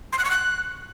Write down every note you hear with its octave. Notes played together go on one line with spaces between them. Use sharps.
C6
F#6
C#6
F#6